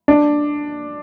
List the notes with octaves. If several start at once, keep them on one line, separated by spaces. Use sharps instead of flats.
D4